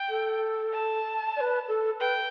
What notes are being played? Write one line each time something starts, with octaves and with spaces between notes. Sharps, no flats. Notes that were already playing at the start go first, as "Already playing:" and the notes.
Already playing: G5
A4
A5
D5
B4
A4
B4 G5